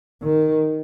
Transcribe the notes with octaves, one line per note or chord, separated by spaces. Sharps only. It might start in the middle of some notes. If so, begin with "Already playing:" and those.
D#3